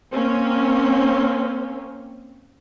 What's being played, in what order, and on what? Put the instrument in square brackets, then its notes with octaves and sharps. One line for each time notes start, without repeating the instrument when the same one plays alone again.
[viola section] A#3 C4 C#4